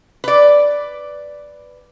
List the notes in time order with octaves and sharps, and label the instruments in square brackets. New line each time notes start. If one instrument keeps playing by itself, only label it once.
[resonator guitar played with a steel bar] B4 D5